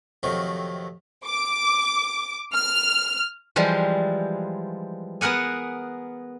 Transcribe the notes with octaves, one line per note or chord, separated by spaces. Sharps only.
F2 C3 D#3 F#3 A3
D6
F6
E3 F3 G3 G#3
B3 G#4 A#4 F#5 G#5